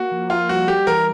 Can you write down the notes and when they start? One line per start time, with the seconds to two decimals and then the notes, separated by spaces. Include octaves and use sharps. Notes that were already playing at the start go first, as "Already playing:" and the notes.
Already playing: A#3 F#4
0.11 F3
0.30 A#3 F4
0.49 G3 F#4
0.68 G3 G4
0.87 E3 A#4